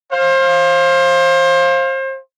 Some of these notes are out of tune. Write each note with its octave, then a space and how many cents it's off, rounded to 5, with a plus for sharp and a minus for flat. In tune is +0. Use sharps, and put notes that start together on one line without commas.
C5 +30 F5 +0